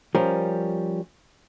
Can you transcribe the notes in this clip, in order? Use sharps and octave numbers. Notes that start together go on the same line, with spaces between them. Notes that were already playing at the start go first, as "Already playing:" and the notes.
F3 G3 C#4 A#4